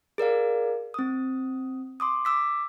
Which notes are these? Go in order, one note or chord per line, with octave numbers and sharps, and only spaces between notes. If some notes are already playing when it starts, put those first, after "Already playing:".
G#4 A#4 D5 F5
C4 D#6
C6 D6 D#6
D6 E6 B6